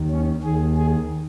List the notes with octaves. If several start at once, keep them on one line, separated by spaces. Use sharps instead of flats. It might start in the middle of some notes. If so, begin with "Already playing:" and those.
Already playing: D#2 D#3
C#4
D#2 D#3 G#4
G#4